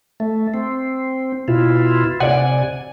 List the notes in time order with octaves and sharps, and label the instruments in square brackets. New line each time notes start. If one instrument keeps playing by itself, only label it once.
[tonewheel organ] A3
C4
B2 E4 F4
[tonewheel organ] C3 G#5 [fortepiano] D5 F#5